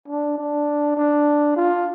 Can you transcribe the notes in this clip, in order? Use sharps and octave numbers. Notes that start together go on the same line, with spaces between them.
D4
D4
D4
F4